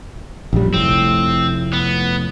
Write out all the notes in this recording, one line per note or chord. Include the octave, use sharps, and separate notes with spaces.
A#1 F#2 G3
F1 A2 C4
B3